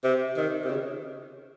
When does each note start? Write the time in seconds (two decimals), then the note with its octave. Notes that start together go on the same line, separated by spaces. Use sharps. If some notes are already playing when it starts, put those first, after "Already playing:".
0.04 C3
0.37 D#3
0.65 C3
0.70 C#3